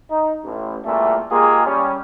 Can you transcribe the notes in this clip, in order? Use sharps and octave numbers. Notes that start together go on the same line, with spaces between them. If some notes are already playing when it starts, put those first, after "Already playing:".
D#4
A1
E2 A#2 G3 A3
G#3 A#3 F4 G4 G#4
G3 C#4